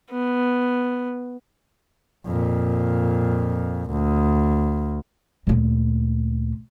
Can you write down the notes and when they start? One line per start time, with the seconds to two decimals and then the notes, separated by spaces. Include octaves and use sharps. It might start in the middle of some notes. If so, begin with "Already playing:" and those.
0.12 B3
2.26 F2 A#2
3.91 D2
5.47 D2 A#2